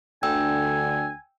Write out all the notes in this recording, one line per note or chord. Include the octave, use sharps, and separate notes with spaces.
D2 D3 G5 G#5 E6